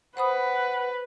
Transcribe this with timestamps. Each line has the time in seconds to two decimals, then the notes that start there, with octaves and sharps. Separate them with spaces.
0.17 B4 C5 F#5 B5 D#6